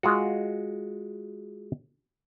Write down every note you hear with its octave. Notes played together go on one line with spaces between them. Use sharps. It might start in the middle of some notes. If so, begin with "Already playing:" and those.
G#3 F4 F#4